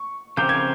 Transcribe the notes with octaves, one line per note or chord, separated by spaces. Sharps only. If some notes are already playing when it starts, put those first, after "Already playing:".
Already playing: C#6
C#3 F3 C4 G4 A#4 G6
G#6